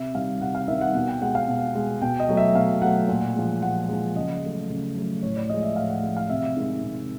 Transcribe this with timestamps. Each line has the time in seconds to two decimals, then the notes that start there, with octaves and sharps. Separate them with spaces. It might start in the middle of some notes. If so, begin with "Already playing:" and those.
Already playing: C3 E5
0.14 D#3 G3 F5
0.41 C3 F#5
0.55 F5
0.68 D#3 G3 E5
0.81 F#5
0.94 B2 F#5
1.08 G5
1.22 G#3 F#5
1.35 F5
1.48 B2
1.75 G#3
2.02 B2 G5
2.20 D#5
2.29 F#3 A3
2.37 E5
2.55 B2 F5
2.82 F#3 A3 F#5
3.08 A#2
3.35 F3 G#3
3.62 A#2 F#5
3.89 F3 G#3
4.16 C#3 D#5
4.42 F#3 A3
4.69 C#3
4.96 F#3 A3
5.22 A2 C#5
5.36 D5
5.49 F3 G#3 D#5
5.63 E5
5.76 A2 F5
5.90 F#5
6.03 F3 G#3 F#5
6.17 F5
6.30 C3 E5
6.56 D#3 G#3
6.83 C3